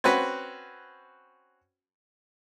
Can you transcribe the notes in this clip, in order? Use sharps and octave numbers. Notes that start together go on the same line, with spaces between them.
C4 C#4 F#4 B4